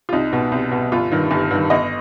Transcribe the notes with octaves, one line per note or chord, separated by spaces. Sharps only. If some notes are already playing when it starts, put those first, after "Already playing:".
F4
C2 D#4
B2
C2
B2
G1 F4
G2 D#3
G1
G2 D#3
G1 D#5